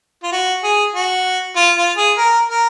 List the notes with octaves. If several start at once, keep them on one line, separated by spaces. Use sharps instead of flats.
F4
F#4
G#4
F#4
F4
F4
G#4
A#4
A#4